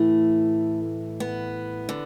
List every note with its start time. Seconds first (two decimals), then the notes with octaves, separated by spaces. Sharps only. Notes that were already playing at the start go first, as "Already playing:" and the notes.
Already playing: A2 E3 A3
1.20 B3
1.89 D3